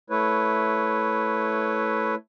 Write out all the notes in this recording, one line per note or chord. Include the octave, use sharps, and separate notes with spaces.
A3 E4 B4 C#5